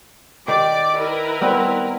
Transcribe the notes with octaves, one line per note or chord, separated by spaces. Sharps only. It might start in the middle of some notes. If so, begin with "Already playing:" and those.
D#3 G4 D5 D6
E4 A#4 B4
G3 B3 C4